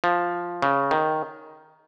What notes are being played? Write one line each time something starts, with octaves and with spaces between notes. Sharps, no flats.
F3
C#3
D#3